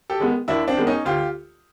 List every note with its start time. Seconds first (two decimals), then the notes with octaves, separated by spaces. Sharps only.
0.10 G4 A4
0.20 D#3 G#3 B3
0.48 D#2 D4 E4
0.68 C4 D4
0.77 D#3 G#3 B3
0.87 C#4 D#4
1.05 D2 F4 G4